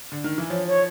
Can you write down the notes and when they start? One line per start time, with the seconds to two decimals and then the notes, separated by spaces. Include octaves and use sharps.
0.12 D3
0.24 D#3
0.38 E3
0.50 F3 C#5
0.67 C#5